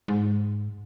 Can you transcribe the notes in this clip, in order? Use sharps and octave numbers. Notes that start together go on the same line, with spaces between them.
G#2